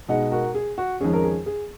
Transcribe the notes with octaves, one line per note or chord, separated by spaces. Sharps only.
B2 G#3 D#4 D#5 F#5
F#4 A#4
G#4
F#4
F2 D#3 G#3 C#4 G#4
A#4
G#4
G#4